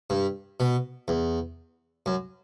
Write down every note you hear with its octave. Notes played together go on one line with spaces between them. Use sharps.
G2
B2
E2
F#2